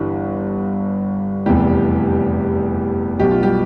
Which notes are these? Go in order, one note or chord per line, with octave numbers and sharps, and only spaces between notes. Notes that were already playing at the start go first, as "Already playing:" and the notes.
Already playing: G1 G2 E3
F1 E2 C3 E3 G3 G4
B1 B2 G4
F4
G3 G4